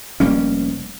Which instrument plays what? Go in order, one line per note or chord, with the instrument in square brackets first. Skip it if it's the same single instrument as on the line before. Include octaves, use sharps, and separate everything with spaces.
[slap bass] F1 G3 A#3 C#4